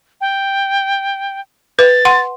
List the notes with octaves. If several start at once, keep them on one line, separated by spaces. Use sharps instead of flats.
G5
B4 A6
F#5 C6